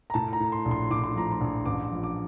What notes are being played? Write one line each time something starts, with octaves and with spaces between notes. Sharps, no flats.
A#5
A2 A5
A#5
A2
C6
A#1
C6
A2 D6
C6
F3 A#5
C6
A#1
A1 D6
F3
D6